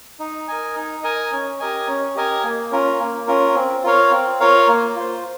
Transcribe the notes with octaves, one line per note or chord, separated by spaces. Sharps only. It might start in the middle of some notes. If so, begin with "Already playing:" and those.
D#4
A#4 D#5 G#5
D#4
A#4 D#5 G#5
C#4
G4 A#4 D#5 G#5
C#4
G4 A#4 D#5 G#5
A#3
C#4 F4 A#4
A#3
C#4 F4 A#4
C4
F4 A#4 C#5 F5
C4
F4 A#4 C#5 F5
A#3
F4 C5